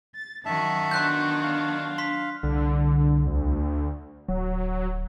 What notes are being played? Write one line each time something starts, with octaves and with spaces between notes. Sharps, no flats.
A6
F#2 D#3 F#4 E5 A5
F#3 B3 D4 C6 F#6 G6
F5
C6 B6
C2 D3
D2
D1 F#3